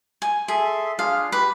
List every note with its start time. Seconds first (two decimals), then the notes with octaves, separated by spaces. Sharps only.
0.22 G#5
0.48 G#4 A4 E5 C6
0.99 D4 F4 G#4 F5
1.32 G4 B4